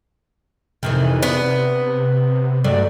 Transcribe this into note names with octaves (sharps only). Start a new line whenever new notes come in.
F2 C3 D#3 E3
B3 D4
G2 F#3 A3 D5